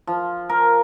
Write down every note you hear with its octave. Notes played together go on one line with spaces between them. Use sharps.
F3
A#4